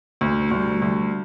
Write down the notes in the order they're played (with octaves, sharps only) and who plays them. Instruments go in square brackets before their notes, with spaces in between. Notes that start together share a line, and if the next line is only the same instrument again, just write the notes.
[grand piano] D2
[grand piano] D2 [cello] G3
[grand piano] D2